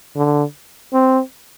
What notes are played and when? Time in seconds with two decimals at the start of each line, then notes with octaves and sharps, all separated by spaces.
0.16 D3
0.93 C4